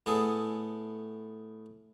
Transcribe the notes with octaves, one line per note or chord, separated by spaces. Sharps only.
A2 B3 G#4 A4 D#6